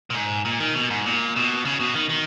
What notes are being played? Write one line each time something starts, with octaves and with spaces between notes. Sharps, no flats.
A#2
G#2
A#2
D#3
B2
G#2
A#2
B2
C#3
B2
D#3
D#3